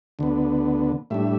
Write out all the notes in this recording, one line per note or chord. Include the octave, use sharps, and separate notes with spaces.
D2 D3 B3
A2 G3 D4 E5